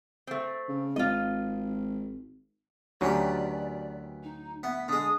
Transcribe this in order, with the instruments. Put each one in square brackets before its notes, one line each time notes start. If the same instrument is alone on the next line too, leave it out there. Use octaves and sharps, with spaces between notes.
[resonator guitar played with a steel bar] A3 C4
[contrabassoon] C#3
[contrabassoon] G#1 [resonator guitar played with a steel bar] F4 D#5
[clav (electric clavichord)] D2 F#3 C#4 [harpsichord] D#3 E3 G4 [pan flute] D5
[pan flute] D#4
[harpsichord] B3 [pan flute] E5
[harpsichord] D3 G#3 [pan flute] D#6